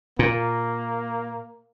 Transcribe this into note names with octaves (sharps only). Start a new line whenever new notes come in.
A#2 A#3